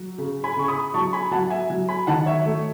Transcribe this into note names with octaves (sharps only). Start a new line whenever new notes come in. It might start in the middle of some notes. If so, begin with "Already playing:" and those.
Already playing: F#3
C#3
G#5 B5
C#3 C#6
B5 D#6
F#3 A5 C#6
G#5 B5
F#3 F#5 A5
E5 G#5
F#3
G#5 B5
D#3 F#5 A5
C#5 E5
A3